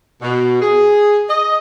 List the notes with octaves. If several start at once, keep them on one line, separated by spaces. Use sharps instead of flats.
B2
G#4
D#5